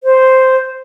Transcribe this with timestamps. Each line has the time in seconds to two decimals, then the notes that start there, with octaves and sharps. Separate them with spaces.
0.04 C5